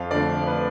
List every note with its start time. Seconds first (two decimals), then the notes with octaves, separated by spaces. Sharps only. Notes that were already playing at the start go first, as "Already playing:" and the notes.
Already playing: F2 F5
0.11 D3 F3 A3 D5
0.47 B4